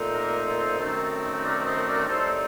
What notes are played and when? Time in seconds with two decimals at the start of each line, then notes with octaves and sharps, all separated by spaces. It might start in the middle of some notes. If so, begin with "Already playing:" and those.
Already playing: A#2 A3 C4 D#4
0.15 G4 A#4
0.47 A4 C5
0.79 F#2 D#3 A3 C4 D#4
1.44 A#4 D5
1.65 C5 D#5
1.87 A#4 D5
2.08 A2 G3 C4 D#4 A4 C5